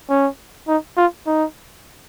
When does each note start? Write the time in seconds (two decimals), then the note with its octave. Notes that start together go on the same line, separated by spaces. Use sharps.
0.10 C#4
0.68 D#4
0.97 F4
1.27 D#4